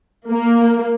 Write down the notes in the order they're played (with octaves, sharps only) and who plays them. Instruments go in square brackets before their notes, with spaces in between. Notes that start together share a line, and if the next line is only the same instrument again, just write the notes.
[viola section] A#3